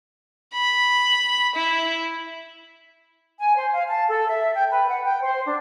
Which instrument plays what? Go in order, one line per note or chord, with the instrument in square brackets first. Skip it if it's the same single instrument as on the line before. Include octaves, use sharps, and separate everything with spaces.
[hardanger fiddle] B5
E4
[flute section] G#5
C5
F5
A5
A4
E5
G5
B4
F#5
G5
C5
D4